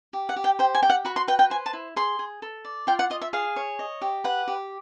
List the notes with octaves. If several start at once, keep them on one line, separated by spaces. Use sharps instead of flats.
G4
F#5
G4
G5
C5 G5
G#5
G4 G5
F#5
F#4 B5
C6
B4 G5
G5
C5 G#5
A5
E4
G#4 C6
G#4
A4
D5
F4 G5
F#5
F4 D#5
E5
G#4 F5
C#5
D#5
G4
B4 F#5
G4